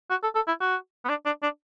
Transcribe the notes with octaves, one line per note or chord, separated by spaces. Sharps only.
F#4
A4
A4
E4
F#4
B3
D4
D4
D4